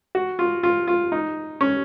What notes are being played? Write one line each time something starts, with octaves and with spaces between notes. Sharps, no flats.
F#4
F4
F4
F4
D#4
C#4